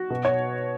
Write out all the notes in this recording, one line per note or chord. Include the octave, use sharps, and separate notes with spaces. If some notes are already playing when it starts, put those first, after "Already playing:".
Already playing: F#4
B2
C#5